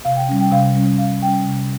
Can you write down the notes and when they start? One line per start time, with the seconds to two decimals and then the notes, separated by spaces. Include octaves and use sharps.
0.05 C3 F5
0.17 G5
0.29 G3 C#4
0.41 G5
0.52 C3 F5
0.75 G3 C#4
0.99 C3 F5
1.22 G3 C#4 G5
1.45 C3